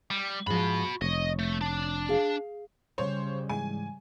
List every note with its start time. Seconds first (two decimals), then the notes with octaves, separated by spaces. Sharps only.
0.11 G3
0.47 G#2 F3 F#4 B5
1.02 F1 C#5 D#5
1.39 A3
1.61 D4
2.09 G#4 F5
2.98 C#3 G3 C5 C#5
3.49 G#2 E3 G#3 G#5